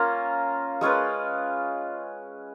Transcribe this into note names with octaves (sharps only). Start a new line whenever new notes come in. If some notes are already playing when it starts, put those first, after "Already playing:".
Already playing: A#3 C#4 F4 A#4
G#3 C#4 F4 B4